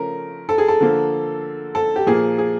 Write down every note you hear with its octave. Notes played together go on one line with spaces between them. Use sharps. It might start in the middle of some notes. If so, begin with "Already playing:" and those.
Already playing: C#3 F3 A3 C#4 A#4
A4
G#4
A4
D3 F3 A#3
A4
G4
A#2 F3 A#3 G#4
G#4